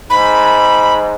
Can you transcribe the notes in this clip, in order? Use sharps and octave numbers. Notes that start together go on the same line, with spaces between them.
G#2 B5